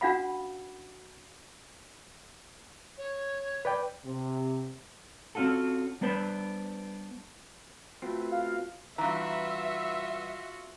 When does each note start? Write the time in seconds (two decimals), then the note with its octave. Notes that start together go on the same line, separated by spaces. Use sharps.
0.01 C#4 D4 F#4 F5 F#5 B5
2.98 C#5
3.65 B4 D5 G5
4.05 C3
5.35 C4 C#4 F4 F#4 A4
6.01 G3 B3 D4 B4 C5
8.02 A3 B3 C4 F4 F#4
8.32 F5
8.98 G2 E3 F4 F#4 E5 A#5